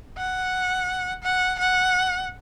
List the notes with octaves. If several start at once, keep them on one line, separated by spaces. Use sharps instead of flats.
F#5
F#5
F#5